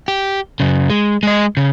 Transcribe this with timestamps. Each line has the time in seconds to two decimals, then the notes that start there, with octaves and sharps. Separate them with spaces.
0.08 G4
0.60 F#2 C#3
0.90 G#3
1.23 G#3 D#5
1.57 C#3